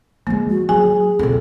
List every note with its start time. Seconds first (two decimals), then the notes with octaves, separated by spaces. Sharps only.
0.27 F3 G#3 A#3
0.50 F#4
0.69 F#3 G#4 G#5
1.19 F2 B2 A4